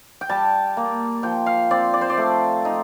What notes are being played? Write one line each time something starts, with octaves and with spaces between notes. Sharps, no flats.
G5
G3 A5
A#3
F3 G5
F5
C4 D5
D5
C5
D5
A3
D#4